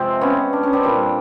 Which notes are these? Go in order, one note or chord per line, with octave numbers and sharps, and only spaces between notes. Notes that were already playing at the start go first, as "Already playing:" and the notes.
Already playing: C3 F3 G#3 C4
B3 C#4
D4
C#4
C4 D4
A#2 G3